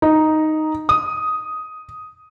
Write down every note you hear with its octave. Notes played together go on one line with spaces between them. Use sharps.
D#4
D#6